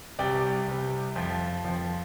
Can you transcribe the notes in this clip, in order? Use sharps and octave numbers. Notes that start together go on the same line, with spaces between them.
C2 C3 G3 D5 G5
C2 C3 G3
F2 F3
F2 F3